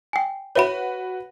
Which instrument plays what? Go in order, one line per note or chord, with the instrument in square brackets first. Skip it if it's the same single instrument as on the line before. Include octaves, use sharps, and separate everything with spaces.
[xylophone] G5 G#5
[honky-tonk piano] F#4 B4 [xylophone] C#5 E5 B5